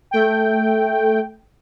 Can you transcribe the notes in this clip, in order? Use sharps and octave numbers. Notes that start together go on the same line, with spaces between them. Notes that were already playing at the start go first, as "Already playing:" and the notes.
A3 G5